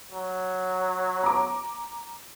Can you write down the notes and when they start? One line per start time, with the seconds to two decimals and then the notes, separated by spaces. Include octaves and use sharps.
0.12 F#3
1.23 A#5 D6